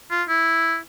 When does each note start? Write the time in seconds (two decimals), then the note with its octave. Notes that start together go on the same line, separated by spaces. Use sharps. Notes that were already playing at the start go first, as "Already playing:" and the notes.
0.11 F4
0.28 E4